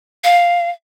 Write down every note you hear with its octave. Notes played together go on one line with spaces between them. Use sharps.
F5